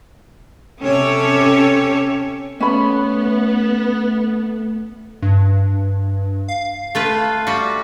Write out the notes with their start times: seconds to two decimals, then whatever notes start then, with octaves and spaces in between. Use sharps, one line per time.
0.83 C3 C#4 G4 A4 C#5
2.60 A3 B3 C#4 B5
5.22 G2
6.48 F5
6.95 A3 F4 B4
7.47 G3 F#4